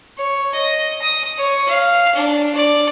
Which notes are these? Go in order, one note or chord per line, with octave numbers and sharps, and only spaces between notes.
C#5
D#5
D#6
C#5
F5
D4
D5